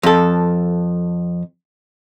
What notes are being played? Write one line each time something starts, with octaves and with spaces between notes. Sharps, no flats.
F2 A4